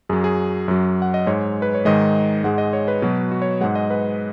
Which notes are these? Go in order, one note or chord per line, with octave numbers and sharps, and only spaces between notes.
F#2 F#3 G#4
G#4
F#2 F#3
F#5
D#5
G#2 G#3 C#5
B4
C#5
G#2 D#3 G#3 D#5
G#2 G#3 F#5
D#5
C#5
B4
B2 F#3
F#4
C#5
G#2 G#3 F#5
D#5
B4